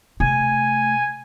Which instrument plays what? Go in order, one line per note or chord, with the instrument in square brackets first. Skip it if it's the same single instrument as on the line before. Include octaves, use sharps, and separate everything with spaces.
[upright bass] C3 A3 [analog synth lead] G#5